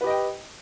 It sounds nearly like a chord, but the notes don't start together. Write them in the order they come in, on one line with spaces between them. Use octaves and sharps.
B4 G4 D#5 G5